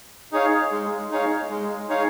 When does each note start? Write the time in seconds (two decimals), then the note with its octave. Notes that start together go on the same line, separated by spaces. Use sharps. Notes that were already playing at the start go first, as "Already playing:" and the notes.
0.32 D#4 G#4 C#5 F5
0.71 G#3
1.11 D#4 G#4 C#5 F5
1.50 G#3
1.89 D#4 G#4 C#5 F5